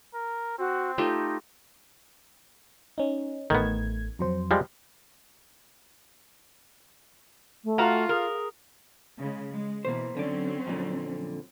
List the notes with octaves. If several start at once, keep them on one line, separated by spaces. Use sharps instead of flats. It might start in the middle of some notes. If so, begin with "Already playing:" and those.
A#4
C4 F#4
A3 D#4 F4 G4
C#4 D#4
A1 D#3 A3 B3 G#6
F2 F#3 C5
F3 G3 G#3
A3
F4 F#4 F5 A#5
G#4 A#4
C#3 G#3
G#3
B2 E3 A#3 C5
D3 F#3 C4 C#4 D5
F2 A#2 D3